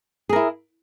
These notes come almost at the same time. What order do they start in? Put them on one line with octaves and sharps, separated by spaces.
G#4 A#4 E4